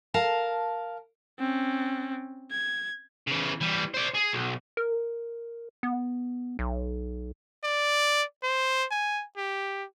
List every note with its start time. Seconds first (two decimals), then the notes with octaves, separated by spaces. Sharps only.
0.14 A#4 F5 A5
1.39 C4 C#4
2.51 G#6
3.27 C#3 E3
3.61 E3 G3
3.94 C5 D5
4.15 G#4
4.33 B1
4.77 A#4
5.83 B3
6.59 B1
7.64 D5
8.43 C5
8.91 G#5
9.37 G4